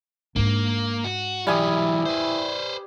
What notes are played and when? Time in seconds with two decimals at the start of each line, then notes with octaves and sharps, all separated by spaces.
0.36 G#2 A#3 D4
1.04 F#4
1.47 E3 F#3 G3 E4 G#5 D#6
2.05 B4 C5